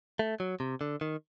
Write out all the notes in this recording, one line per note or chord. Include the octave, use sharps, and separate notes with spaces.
A3
F#3
C3
D3
D#3